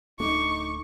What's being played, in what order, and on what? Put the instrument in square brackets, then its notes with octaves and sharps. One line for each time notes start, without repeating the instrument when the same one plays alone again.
[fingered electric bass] D1 A3 D4 [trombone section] D#4 [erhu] C#6 [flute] D6